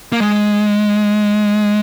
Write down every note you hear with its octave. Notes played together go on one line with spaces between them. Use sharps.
A#3
G#3